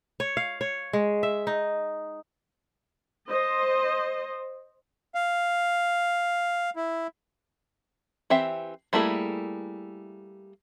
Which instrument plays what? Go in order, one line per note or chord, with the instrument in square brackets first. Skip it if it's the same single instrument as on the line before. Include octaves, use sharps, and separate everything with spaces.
[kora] C#5
F5
C#5
G#3
E5
D#4
[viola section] C5 D#5
[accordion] F5
E4
[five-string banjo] E3 C4 G4 E5
G3 A3 A#3 E4 G#4